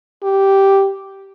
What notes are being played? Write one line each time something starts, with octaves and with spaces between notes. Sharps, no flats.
G4